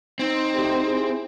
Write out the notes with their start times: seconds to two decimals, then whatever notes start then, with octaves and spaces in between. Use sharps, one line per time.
0.19 C4 D#4
0.55 D2 G4
0.86 E4 G#4